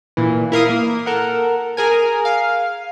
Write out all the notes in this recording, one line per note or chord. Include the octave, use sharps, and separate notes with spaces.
A#2 E3
E4 A#4 F5 D#6
A#3
A4 A#4 F#5
G#4 A#4 G#5
F5